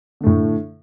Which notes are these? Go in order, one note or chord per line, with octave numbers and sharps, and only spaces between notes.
A2 D3 A3